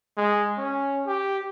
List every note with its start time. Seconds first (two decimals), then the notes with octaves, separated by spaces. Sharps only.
0.17 G#3
0.58 C#4
1.07 G4